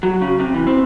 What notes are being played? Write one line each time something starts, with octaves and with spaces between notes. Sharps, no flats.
F#3
C#3
C3
E3
C4